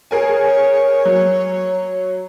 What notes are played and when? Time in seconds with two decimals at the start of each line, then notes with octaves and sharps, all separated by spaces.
0.11 G#4 A#4 C#5 G#5
1.05 F#3